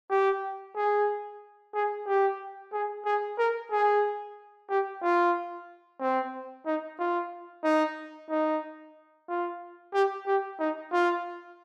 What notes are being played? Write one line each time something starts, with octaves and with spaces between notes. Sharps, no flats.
G4
G#4
G#4
G4
G#4
G#4
A#4
G#4
G4
F4
C4
D#4
F4
D#4
D#4
F4
G4
G4
D#4
F4